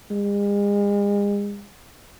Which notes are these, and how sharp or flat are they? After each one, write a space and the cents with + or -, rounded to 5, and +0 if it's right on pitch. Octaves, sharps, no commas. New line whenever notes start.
G#3 -40